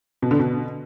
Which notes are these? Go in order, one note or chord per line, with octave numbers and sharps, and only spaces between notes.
B2
D3
B2